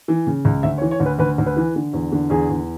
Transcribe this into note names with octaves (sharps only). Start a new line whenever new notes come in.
E3
C#3
C#2
D2 E5
C#5
E3
C#5
D2
B4
D2 B4
D2
B4
E3
D3
E2
D3
E2 G#4
E2